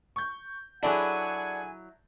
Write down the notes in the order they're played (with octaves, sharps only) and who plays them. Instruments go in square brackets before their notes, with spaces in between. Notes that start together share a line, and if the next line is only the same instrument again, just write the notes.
[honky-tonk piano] C#6 G6
[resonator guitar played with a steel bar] F#3 E4 [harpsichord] D4 [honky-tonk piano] G#4 A4 [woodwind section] F#5 G#5